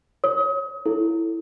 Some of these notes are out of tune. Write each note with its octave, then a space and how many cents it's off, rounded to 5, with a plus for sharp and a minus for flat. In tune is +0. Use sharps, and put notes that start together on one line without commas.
C#5 +0 D#6 +35
E4 +0 A4 +0